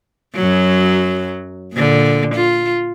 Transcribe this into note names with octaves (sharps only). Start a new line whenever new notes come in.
F#2 F#3
A#2 D3
F4